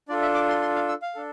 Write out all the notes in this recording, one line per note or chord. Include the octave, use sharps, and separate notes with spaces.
D4 F4 A4 D5
E5
D6
C6
C6
F5
E6
F5
D4 A4